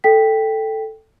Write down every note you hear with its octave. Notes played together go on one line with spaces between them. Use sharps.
A4 G5 B6